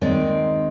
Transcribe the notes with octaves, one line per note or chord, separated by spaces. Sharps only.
D#2 D#3 G#3 C4 D5